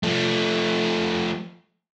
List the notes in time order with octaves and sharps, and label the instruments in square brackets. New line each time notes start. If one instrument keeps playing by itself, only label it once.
[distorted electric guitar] F3 A3